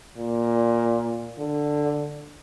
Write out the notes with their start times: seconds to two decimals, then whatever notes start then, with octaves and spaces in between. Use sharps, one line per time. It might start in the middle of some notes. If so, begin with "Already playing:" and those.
0.18 A#2
1.39 D3